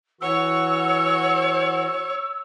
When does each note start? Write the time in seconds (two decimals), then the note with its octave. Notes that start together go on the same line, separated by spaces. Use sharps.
0.21 E3 F#4 C#5 F#5 E6